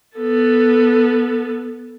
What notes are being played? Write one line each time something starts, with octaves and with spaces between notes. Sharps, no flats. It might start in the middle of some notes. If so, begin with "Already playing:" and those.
B3 A4